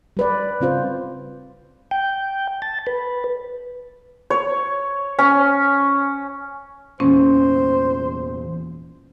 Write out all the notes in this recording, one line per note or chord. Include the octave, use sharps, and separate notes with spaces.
G3 B4 D5
C#3 C4 F4 C5
G5
A5
B4
C#5
C#4
E2 A#2 C#4 C5